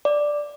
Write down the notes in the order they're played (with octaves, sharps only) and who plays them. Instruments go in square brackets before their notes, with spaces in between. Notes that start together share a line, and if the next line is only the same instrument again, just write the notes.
[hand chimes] D5